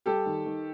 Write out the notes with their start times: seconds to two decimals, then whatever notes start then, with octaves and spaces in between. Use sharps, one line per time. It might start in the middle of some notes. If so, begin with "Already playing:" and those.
0.06 G3 G4 A4
0.26 D#3
0.45 D#3